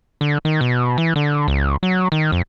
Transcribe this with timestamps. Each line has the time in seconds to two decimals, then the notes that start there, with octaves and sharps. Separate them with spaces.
0.21 D3
0.45 D#3
0.61 B2
0.98 E3
1.16 D3
1.48 C#2
1.83 F#3
2.12 D#3
2.32 F2